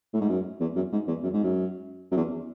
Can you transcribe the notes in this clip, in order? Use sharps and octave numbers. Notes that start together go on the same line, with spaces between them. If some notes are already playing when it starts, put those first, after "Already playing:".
A2
G#2
F#2
E2
F#2
G#2
E2
F#2
G#2
F#2
F#2
E2